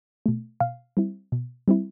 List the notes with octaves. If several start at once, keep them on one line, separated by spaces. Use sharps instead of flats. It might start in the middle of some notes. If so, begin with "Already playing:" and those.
B2 A3
B2 F5
G3 C4 E4
B2
G3 C4 E4